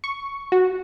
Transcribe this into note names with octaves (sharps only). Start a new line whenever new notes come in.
C#6
F#4